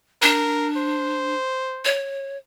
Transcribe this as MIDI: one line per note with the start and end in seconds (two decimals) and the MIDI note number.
0.22 1.34 62
0.22 0.68 70
0.76 1.95 72
1.85 2.37 73